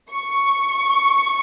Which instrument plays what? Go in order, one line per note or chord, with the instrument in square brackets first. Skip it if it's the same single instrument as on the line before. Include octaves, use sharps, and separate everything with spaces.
[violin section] C#6